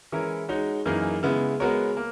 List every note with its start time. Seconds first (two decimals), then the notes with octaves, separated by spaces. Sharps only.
0.12 E3 G#3 C#4 E4 A#4
0.49 G#3 D#4 F#4 C#5
0.86 F#2 E3 A#3 D#4 G#4
1.23 C#3 G#3 B3 E4
1.60 G#3 B3 F#4 A#4 C#5
1.97 A#3